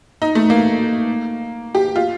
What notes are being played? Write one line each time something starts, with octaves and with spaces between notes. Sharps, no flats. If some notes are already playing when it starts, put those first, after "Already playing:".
D#4
A3
A#3
G4
F4